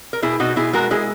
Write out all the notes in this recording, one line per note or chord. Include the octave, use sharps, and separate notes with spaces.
A#4
B2 E4 G#4
B2 D#4 F#4
B2 E4 G#4
G#3 F#4 A#4
G#3 E4 G#4